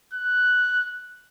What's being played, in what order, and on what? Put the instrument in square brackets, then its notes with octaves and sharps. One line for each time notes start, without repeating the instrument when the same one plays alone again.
[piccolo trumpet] F#6